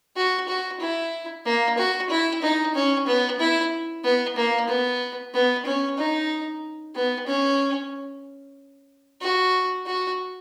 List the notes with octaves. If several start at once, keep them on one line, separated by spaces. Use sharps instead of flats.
F#4
F#4
E4
A#3
F#4
E4
D#4
C#4
B3
E4
B3
A#3
B3
B3
C#4
D#4
B3
C#4
F#4
F#4